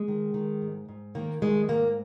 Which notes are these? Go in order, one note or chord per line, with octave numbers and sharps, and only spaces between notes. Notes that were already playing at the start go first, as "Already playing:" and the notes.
Already playing: G#3
D#3
D#3
G#2
G#2
D#3 A#3
D#3 G#3
G#2 A#3